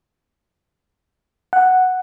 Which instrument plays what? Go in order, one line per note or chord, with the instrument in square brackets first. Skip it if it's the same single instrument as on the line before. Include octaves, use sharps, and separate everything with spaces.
[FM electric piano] F#5